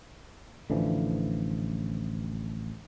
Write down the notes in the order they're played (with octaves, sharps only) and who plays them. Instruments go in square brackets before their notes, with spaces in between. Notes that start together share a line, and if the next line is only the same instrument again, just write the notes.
[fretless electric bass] A1 D3 E3 F3